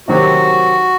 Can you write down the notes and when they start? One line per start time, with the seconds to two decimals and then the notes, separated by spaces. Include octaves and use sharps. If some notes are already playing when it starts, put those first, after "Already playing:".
0.08 C3 D#3 F#3 C4 F#4 G4